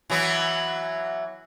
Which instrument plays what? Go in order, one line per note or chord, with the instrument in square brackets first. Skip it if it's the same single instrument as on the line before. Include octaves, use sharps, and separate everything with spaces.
[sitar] E3 F#3 B3